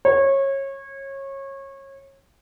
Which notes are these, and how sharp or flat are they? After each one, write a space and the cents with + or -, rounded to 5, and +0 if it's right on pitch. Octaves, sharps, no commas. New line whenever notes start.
C#5 -25